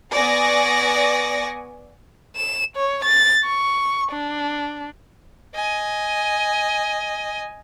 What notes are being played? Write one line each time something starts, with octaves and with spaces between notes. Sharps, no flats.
B3 D5 G#5 C#6 D#6 A#6
E7
C#5
A6
C#6
D4
D#5 G#5